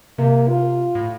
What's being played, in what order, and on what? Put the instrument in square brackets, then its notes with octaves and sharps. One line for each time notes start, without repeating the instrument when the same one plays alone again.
[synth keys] C3 [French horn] A#3
[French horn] F4
[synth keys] A2